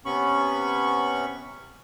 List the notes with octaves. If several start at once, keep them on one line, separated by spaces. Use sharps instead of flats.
C3 B3 C#4 B5 C#6